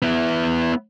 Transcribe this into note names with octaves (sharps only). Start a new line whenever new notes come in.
B3 E4